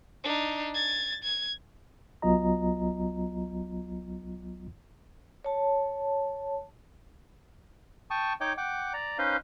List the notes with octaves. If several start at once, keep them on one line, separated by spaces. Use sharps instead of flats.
D4 D#4
G#6 A6
G#6
C2 F#3 B3 F4 D#5 A#5
C#5 A5
G5 A5 C#6 D#6
D#4 C#5 D#5 G5 D6
F#5 G5 D6
D5 A#5
C#4 D#4 B4 C5 D#5 F5